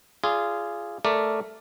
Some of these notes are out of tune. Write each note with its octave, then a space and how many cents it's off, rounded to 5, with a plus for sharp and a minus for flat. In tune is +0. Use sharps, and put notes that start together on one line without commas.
F4 -20 G#4 +0 D5 +0
A3 +0 A#4 +0 D5 +0